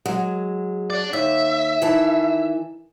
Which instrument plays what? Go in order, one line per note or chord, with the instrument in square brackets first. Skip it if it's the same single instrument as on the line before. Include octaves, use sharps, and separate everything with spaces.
[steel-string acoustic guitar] F#3 G#3
[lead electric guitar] D4 D5
[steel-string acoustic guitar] D#2 [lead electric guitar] E5
[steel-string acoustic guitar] D#3 E3 A5